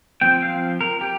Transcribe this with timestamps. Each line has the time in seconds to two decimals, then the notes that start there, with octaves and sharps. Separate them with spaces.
0.21 F3 C4 G5
0.42 F5
0.81 A#4
1.01 G4